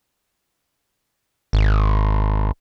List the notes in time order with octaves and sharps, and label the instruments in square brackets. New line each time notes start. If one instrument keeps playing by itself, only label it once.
[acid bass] G#1